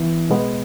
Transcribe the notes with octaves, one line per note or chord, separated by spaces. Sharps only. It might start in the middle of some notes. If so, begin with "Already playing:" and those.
Already playing: E3 B3 E4
B2 G#3 B3